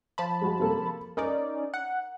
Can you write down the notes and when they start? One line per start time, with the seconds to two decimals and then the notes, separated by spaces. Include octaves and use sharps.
0.18 F3 A5 B5
0.41 G#3 F#4
0.60 C3 A#3 A4
1.17 C#4 D#4 A#4 D5
1.74 F#5